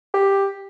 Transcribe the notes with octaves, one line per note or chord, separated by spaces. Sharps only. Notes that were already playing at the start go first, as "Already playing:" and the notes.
G4